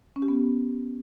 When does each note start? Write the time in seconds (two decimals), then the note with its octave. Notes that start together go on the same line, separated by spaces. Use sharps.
0.16 C#4
0.22 G4
0.28 B3